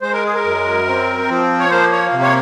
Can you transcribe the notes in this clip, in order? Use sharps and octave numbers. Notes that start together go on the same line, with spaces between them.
G#3 C5
A#4
G#4
A#4
F#2
C4
F3
C#5
A#3 C5
C#5
C3
C#5